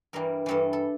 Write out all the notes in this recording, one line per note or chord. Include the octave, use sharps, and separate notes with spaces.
G2 E3 G3 A#4
G2 E3 G3 A4
A4